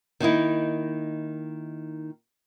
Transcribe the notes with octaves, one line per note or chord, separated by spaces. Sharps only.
D#3 A#3 D#4 E4